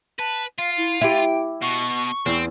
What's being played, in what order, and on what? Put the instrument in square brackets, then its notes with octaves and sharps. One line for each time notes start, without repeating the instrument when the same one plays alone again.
[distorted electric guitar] B4 [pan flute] A5
[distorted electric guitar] F4 [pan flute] F5
[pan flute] E4
[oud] E4 G4 [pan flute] G5
[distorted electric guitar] B2 [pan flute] C#6
[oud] E2 [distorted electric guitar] C4